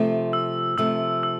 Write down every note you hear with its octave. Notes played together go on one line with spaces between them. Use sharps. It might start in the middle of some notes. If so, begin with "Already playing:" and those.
Already playing: C3 F3 A3
E6
C3 F3 A3 E6
E6